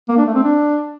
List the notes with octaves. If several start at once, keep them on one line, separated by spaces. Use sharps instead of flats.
A#3
D4
A3
C4
D4